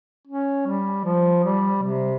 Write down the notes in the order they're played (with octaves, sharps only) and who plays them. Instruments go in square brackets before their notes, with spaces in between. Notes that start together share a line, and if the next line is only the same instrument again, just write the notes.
[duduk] C#4
G3
F3
G3
C3